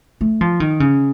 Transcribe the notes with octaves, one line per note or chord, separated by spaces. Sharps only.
A3
F3
D#3
C#3